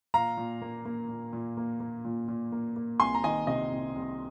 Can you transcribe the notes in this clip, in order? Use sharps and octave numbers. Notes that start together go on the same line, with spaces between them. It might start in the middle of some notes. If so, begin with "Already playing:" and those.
A#2 F5 A#5
A#2
A#3
A#3
A#2
A#2
A#3
A#3
A#2
A#2
A#3
A#3
C2 G#5 C6
A#5
D#3 D#5 G#5
C3 D#5
C2
C2